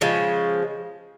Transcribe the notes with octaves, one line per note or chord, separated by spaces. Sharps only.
C#3 F3 G#3